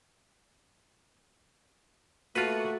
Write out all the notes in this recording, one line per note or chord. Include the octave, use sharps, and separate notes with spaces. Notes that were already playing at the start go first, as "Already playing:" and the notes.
A3 A#3 F4 F#4 B4